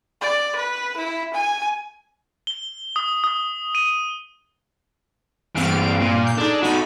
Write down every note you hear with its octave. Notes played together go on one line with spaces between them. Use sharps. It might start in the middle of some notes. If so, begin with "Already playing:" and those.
D5
B4
E4
G#5
G7
D#6
D#6
D#7
G2 E3 C4 F5 D7
A#2
G6
D4 D#4 G#4 A4
D#4 F#4 A4 B5